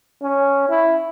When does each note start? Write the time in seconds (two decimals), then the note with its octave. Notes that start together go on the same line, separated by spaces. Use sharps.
0.21 C#4
0.69 E4